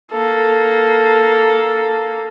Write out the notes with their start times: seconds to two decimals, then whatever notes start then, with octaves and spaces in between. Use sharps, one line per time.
0.12 A#3 A4